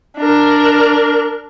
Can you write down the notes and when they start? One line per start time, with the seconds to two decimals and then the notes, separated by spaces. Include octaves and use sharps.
0.18 D4 A#4